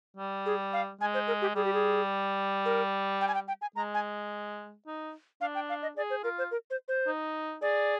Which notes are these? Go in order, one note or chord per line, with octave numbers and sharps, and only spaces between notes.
G3
G#4
F5
G#3 G#5
C5
A#4
G4
G3 G#4
G4
G#4
A#4
G5
G#5
G5
G5
G#5
G#3 A#5
G#5
D#4
D4 F5
G5
F5
D#5
G#4 D5
C5
F4 A#4
C5
A#4
C5
C5
D#4
G#4 D5